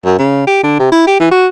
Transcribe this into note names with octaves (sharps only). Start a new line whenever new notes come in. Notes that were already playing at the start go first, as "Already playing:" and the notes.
F#2
C#3
G4
D3
C3
E4
G4
E3
F#4